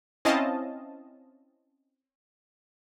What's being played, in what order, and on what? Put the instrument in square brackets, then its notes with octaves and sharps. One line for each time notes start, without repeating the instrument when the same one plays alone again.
[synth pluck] C4 C#4 E4 D#5 F5 A5